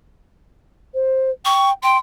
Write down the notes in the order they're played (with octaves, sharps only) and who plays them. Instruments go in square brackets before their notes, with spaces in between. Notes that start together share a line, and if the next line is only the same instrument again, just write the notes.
[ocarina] C5
[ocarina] G5 [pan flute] C#6
[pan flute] G5 [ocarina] C6